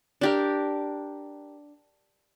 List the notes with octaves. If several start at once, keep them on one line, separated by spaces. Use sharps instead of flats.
D4 G4 A#4